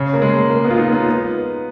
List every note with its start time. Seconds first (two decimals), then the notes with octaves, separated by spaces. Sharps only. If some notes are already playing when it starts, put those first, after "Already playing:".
Already playing: C#3
0.14 A#3
0.22 G#3
0.50 A#3
0.64 B3
0.71 F4
0.77 D#4
0.92 B3